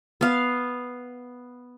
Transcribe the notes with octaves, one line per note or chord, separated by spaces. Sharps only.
B3 F5